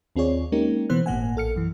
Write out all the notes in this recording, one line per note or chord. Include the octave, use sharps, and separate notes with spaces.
D#2 C4 F4 G#4 C#5 D5
G#3 A#3 C#4 D#4 G4 A#4
B2 E3 B3 C5 F#6
G1 A2 A#3 F#5 G#5
A#1 A4 F6 C#7
F#2 E3